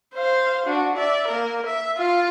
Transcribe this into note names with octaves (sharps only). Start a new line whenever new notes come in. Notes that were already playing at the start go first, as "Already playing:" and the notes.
C5 F5
D4 F#4
D5 E5
A#3 A#4
E5
F4 F5